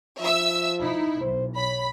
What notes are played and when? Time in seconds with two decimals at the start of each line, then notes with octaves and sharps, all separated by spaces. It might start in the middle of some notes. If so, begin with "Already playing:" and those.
0.21 F3 E5 E6
0.81 D#4 E4
1.21 B1 C5
1.57 C#5 B5